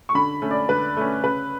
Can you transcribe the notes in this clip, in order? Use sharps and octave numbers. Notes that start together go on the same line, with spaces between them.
C#6
D3 B5
A3 C#4
D5
D3 B4
A3 C#4
C#3 B4